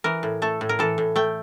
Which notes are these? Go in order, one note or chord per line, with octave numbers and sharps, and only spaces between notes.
E3 A#4
A2
A3 A4
A2
A#4
E3 A4
A2
A3 G5